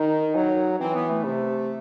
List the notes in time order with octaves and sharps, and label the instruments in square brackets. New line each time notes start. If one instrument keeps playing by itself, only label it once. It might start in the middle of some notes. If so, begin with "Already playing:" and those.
Already playing: [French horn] D#3 [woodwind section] D#4
[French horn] F#3
[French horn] E3 [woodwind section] C4
[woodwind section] B3
A3
[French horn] C3